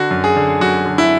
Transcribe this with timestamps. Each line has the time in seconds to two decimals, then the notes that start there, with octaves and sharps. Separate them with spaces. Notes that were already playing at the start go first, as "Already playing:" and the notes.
Already playing: D3 F#4
0.11 F#2
0.24 G#4
0.36 D3
0.61 F#2 F#4
0.86 D3
0.98 E4